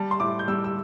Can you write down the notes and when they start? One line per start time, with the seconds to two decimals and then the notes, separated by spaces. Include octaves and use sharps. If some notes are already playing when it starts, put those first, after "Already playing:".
Already playing: G3 A5
0.11 C6
0.20 A2 D6
0.39 G6
0.48 G3 E6
0.64 E6